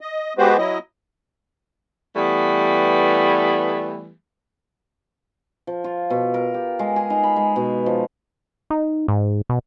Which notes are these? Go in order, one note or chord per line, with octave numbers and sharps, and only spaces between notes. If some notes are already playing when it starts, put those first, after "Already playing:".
D#5
G#3 B3 F#4 G4 B4 C5
F#3 E4 D#5
E3 G3 A3 B3
F3
F4
B2
A#4
G4
G#3
G#4
D#4
B5
G#3
B2
F3
D#4
G#2
B2